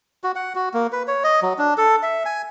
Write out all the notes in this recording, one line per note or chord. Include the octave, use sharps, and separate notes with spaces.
F#4
F#5
F#4
A#3
B4
C#5
D#5
F#3
D4
A4
E5
G#5